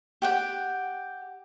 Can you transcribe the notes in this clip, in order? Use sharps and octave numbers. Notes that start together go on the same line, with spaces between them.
G4 F#5 G5